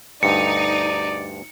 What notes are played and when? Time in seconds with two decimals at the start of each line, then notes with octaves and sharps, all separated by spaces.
0.23 D2 G2 D#4 D5 C#7